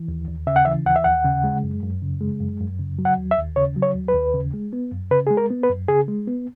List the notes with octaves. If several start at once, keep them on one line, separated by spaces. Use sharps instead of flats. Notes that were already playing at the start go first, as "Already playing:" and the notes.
Already playing: E3
D#2
D#2
C#3 E5
F#5
E3 E5
D#2 F#5
E5
D#2 F#5
C#3
G#3
F#2
F#2
C#3
G#3
F#2
F#2
C#3
F#3
F#5
D#2
E5
D#2
C#3 C#5
F#3
C#5
D#2
B4
D#2
C#3
G#3
B3
F#2
C#3 B4
G#3 G#4
A#4
B3
B4
F#2
C#3 G#4
G#3
B3